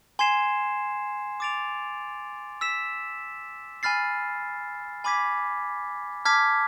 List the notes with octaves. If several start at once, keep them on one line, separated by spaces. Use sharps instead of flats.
G#5 C6 G#6 C7 E7
D6 A6 D7 F7
E6 B6 E7
G#5 B5 F6 A6 C7
G#5 B5 D6 G#6 B6
A5 D6 F6 G#6 B6